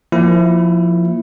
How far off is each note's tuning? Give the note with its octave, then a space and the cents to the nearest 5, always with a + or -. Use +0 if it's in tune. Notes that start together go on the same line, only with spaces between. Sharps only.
F3 +0 A#3 +0 E4 +0